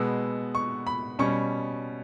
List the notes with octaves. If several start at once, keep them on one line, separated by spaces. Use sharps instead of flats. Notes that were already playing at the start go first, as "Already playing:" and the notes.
Already playing: B2 G#3 B3 E6
C#6
B5
B2 G3 C#4 C#6